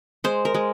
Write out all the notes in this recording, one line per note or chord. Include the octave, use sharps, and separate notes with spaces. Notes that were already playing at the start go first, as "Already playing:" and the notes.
G#3 C5
A#4
G#3